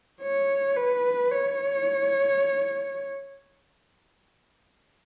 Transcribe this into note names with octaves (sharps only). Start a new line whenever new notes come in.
C#5
B4
C#5